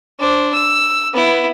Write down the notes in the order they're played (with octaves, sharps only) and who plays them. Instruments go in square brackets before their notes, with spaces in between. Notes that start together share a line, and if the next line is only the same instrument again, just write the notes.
[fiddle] D4 C5
E6
B3 E4